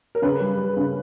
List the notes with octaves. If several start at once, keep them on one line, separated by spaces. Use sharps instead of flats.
A#4
C#3 B4
G3
G3
C#3